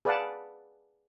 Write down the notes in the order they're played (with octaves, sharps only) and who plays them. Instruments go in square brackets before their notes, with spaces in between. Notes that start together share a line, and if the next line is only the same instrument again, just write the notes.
[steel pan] G#4 B4 D5 F5 F#5 A5